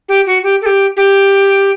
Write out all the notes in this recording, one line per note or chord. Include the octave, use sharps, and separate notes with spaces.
G4
F#4
G4
A4
G4
G4